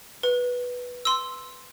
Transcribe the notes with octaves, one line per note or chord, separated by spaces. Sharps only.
B4
C6 E6